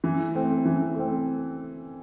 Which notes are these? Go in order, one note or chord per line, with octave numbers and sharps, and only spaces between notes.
E3
A3 C4
E3
A3 C4